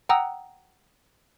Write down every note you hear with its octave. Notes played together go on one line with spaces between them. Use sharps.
F#5 G5 A#5 D#6 E6 F#6